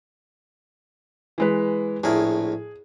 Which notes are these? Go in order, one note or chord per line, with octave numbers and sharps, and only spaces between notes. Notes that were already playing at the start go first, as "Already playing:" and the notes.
E3 G#3 B4
A#1 A2 G#4 A#4